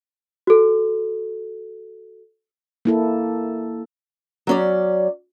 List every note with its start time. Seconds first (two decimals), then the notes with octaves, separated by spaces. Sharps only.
0.47 F#4 A4
2.85 A#3 E4 A4
4.47 F#3 C#4 D5